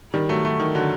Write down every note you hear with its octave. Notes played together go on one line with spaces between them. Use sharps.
D#3 G3
F#3 A3
F#3 A3
D#3
D3 F#3